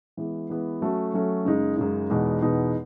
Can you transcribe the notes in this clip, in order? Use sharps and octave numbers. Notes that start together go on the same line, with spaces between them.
E3 G#3 B3
E3 G#3 B3
F#3 A3 C#4 F#4 A4
F#3 A3 C#4 F#4 A4
F#2 C#3 G#3 D#4
F#2 C#3 G#3 D#4
E2 B2 G#3 B3 D#4
E2 B2 G#3 B3 D#4